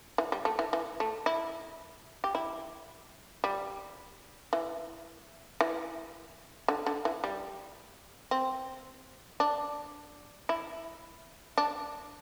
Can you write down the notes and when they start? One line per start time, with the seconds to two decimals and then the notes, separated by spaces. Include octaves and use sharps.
0.18 E3
0.32 G3
0.45 A3
0.59 E3
0.73 E3
1.00 A3
1.26 E4
2.24 G4
2.35 E4
3.44 G3
4.53 E3
5.61 E3
6.68 D3
6.86 D3
7.05 E3
7.24 G3
8.31 C4
9.40 D4
10.49 E4
11.58 D4